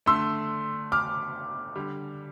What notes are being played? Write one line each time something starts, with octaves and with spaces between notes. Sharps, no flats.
D3 A3 C6 E6
D6 F6
D3 G3